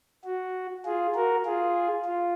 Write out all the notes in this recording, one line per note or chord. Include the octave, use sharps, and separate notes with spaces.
F#4
F4 G#4
F#4 A#4
F4 G#4
F4